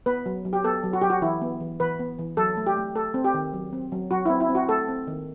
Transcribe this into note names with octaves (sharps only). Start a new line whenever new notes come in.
B3 B4
F#3
F#3
G4
B3 A4
F#3
F#4
F#3 G4
F#4
E3 E4
B3
E3
E3 B4
B3
E3
F#3 A4
A3
G4
A3
A3 A4
C4
G4
D#3
F#3
C4
F#3
F#3 F#4
E4
C4
E4
C4
F#4
A3 A4
C4
D#3